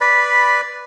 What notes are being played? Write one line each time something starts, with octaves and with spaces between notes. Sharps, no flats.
B4 D5 B5